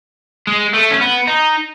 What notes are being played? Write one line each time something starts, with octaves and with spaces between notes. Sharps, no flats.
G#3
A3
C#4
B3
D#4